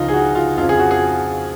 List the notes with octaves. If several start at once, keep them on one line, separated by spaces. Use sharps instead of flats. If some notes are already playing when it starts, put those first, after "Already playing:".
Already playing: C#2 C#3 F3 D#4 F4
G#4
F#4
F4
F2 C#3 F3 F4
G#4
F#4
G#4